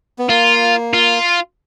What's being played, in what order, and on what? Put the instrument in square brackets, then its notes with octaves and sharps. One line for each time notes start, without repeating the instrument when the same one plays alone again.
[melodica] B3
[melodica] A#3 [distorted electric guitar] F4
[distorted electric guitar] F4